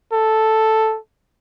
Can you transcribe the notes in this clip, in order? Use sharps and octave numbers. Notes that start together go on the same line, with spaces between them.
A4